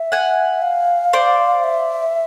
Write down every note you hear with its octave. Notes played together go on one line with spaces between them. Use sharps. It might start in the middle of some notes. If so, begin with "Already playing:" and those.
Already playing: E5
F#5 G#5
F5
C5 D5
E5